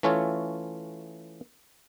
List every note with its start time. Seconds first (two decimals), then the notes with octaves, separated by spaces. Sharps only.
0.03 E3 A3 C#4 F4 A4 C#5